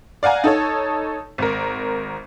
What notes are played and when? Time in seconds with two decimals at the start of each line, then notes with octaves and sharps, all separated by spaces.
0.23 D5 F5 F#5 G#5 A#5
0.44 D#4 A4 C#5
1.38 G#1 A#4